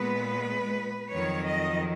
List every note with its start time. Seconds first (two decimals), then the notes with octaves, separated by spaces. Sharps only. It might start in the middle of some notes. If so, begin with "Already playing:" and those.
Already playing: A#2 G#3 B3 B4
1.12 F2 D#3 F#3 C#5
1.46 D#5